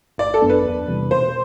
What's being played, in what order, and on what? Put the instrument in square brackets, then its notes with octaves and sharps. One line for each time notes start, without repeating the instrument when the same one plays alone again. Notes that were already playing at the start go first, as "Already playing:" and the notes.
[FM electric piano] G1 [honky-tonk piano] D5
[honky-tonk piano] A4
[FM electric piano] F#2 F#3 B3 D4
[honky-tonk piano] B4
[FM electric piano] E2
C3 E3 G3
[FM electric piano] B2 [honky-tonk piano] C5